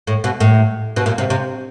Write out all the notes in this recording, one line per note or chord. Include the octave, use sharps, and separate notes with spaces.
A2
B2
A2
B2
A#2
C3
C3